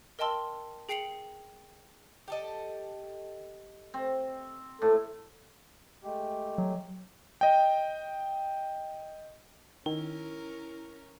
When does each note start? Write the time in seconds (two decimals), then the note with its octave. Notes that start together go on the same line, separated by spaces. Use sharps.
0.19 A#4 D#5 G5 A5 C6 E6
0.89 G#4 G5 C7 C#7 F7 F#7
2.28 G4 A4 D#5
3.94 C4
4.82 A2 A4
6.03 G#3 A3 G4
6.58 F#3
7.41 D#5 G5
9.86 D#3 C#4 E4 A#4